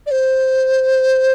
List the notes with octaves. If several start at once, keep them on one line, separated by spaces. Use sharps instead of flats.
D5
C5